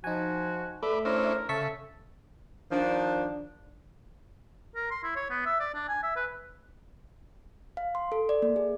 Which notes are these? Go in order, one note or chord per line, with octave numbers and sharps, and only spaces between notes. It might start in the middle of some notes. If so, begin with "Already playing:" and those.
F3 D#4 F#4 G#5
A3 B4 D5 E5
C#4 D4 E4 A#4 C5
C#3 A4 E5 A5 C#6 B6
D#3 F3 D4
A#4
C6
E4
C#5
B3
E5
D5
D4
G#5
E5
B4
F5
C6
A4
D5
A#3
G#4